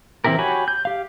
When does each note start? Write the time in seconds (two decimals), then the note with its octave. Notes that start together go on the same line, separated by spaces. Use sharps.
0.24 E3 C4 E4 G4 A#4
0.39 F#4 G4 C#5 G#5 B5
0.68 G6
0.85 G4 F5